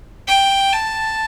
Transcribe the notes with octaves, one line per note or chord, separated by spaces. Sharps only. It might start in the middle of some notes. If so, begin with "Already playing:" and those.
G5
A5